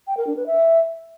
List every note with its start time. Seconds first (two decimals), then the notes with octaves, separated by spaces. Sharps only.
0.07 G5
0.17 A#4
0.27 D4
0.37 B4
0.46 E5